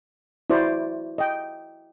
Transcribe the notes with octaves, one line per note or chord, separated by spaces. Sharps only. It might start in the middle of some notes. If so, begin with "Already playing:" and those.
E4 F#4 C5 D5
D#5 G5